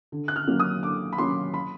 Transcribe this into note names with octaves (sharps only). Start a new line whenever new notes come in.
D3
F#6
F6
F#3 A#3 C#4
D#6
D3 D6
B5
F#3 A#3 C#4 C6
B5